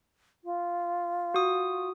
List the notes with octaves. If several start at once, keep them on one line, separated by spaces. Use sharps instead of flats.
F4
F#4 D#6